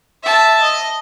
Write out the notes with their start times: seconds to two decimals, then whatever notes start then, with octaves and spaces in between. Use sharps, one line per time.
0.23 E5 A5
0.62 D#5